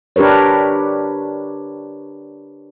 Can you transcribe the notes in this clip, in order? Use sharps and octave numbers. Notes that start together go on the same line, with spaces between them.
D4 G4 A#4 B4 C#5